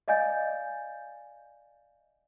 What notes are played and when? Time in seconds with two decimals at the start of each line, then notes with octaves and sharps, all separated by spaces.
0.08 D5 D#5 F5 G#5 G6 A6